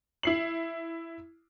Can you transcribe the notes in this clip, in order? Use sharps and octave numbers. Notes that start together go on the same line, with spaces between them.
E4 C7 F#7